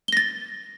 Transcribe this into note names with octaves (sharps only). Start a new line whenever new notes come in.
A6 A#6 G7